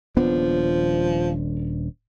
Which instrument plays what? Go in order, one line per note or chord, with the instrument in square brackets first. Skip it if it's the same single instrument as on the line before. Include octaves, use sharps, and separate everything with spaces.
[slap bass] D#1 B3 D4 [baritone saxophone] F3